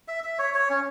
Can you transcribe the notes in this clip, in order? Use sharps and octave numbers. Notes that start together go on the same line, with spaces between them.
E5
E5
C#5
C#5
C#4